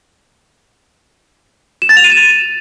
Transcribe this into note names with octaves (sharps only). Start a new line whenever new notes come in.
E7
A6
F7
D#7
E7